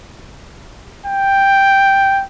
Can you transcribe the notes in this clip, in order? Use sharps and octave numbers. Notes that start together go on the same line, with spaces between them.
G5